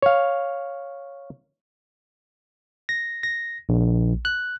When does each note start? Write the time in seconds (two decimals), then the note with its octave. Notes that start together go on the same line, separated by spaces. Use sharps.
0.02 C#5 F5
2.89 A#6
3.23 A#6
3.69 A#1
4.25 F#6